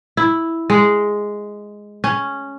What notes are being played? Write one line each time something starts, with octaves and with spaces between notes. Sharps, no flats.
E4
G#3
C#4